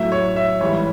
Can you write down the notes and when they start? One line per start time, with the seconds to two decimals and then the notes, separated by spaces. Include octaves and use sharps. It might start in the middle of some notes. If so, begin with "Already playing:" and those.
Already playing: A2 F#3 E5
0.12 C#5
0.36 E5
0.60 G#2 E3 G3 C#5